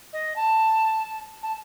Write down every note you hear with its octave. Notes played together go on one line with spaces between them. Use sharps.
D#5
A5
A5